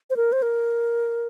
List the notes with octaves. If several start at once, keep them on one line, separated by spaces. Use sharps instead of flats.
C5
A#4
C5
A#4